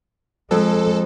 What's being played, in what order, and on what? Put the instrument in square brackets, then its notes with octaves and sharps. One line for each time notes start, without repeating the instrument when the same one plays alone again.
[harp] F2 [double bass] G#3 [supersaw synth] A4